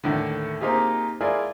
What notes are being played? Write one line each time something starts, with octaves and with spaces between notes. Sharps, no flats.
D#2 A2 D3
A#3 C4 D#4 F4 G4 G#4
E4 F4 G#4 A#4 D5